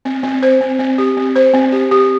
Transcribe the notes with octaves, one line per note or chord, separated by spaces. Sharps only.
C4
C4
C5
C4
C4
G4
C4
C5
C4
G4
G4